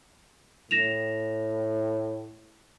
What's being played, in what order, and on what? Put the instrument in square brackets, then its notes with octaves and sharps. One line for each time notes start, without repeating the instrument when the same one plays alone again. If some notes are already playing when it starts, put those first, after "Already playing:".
[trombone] A2 [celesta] A#6 E7 F7